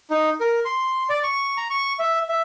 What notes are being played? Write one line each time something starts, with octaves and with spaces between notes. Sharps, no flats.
D#4
A#4
C6
D5
C#6
A#5
C#6
E5
E5